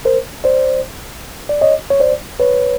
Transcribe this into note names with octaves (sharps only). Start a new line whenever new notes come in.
A#4 C5
C5 D5
D5
C#5 D#5
C#5
C5 D5
B4 C#5